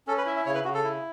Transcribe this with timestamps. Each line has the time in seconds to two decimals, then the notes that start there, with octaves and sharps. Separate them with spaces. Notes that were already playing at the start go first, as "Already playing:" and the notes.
0.07 C#4 A4
0.18 B4
0.26 E4 E5
0.36 E5
0.46 C#3 C#5
0.55 B4
0.65 C#3 F#4
0.74 A4
0.84 E4